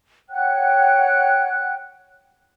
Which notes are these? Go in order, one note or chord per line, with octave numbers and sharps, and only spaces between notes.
C#5 F#5 G5 F#6